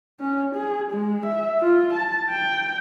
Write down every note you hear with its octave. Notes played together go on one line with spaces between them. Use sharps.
C#4
G#4
G#3
E5
F4
A5
G5